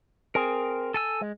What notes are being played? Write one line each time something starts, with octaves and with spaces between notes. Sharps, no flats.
C4 G#4 A#4
A4 G#5 E6
G#3